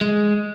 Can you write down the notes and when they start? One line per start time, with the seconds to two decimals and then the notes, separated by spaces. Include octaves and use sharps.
0.01 G#3